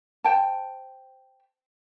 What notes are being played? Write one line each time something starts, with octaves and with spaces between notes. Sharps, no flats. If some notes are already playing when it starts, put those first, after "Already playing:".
C5 G5 A5